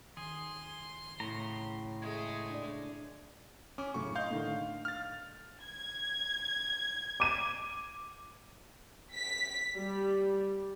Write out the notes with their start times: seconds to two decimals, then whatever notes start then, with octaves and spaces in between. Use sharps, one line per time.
0.17 D#3 G#4 C6
1.20 A2 C#3 A#5
2.02 G#3 A3
2.50 D4 D5
3.78 C#4 D6
3.94 F#2 A2 C#3 C#6
4.15 D#5 F5 C6 G6
4.30 A2 D3 D#3
4.85 F6 A6
5.62 G#6
7.20 D6 D#7
9.14 B6
9.77 G3